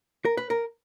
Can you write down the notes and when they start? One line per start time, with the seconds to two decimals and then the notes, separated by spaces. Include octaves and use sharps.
0.25 A#4
0.37 B4
0.50 A#4